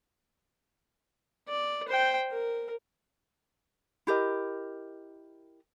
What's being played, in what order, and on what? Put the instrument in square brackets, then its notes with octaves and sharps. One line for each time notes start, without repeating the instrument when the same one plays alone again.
[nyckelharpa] D5
C5 G5
A#4
[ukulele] E4 G4 A#4 D#5